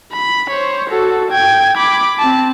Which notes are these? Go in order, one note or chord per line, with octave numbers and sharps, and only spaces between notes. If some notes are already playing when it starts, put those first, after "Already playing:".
B5
C5 C#5
F#4 A4
G5 G#6
B5 D6
C4 A5